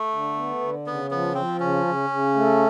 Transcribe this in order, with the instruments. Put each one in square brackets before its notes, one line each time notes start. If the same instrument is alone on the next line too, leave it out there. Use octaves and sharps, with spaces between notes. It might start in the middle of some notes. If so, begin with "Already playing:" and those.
Already playing: [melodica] A3
[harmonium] D3
B3
D3
[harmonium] C#3 [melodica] B3
[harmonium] F3 [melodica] B3
[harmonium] F3 [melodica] C4
[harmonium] C#3 [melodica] C#4
[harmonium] C#3
C#3
A3